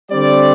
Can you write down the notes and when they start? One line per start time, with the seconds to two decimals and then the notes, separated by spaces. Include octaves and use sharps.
0.11 D3 G3 C4 D5